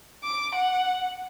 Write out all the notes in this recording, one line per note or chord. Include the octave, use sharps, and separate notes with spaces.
D6 D7
F#5